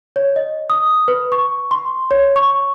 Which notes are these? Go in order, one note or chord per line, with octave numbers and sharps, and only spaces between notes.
C#5
D#5
D#6
B4
C#6
C6
C#5
C#6